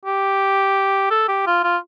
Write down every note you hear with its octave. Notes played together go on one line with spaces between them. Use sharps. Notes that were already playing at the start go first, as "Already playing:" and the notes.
G4
A4
G4
F4
F4